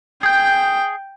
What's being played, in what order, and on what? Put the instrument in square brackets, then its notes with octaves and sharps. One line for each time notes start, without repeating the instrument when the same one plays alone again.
[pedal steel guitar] G#4 G6 [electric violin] G5